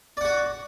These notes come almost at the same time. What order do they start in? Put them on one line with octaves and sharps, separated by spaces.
D5 F#5 F#4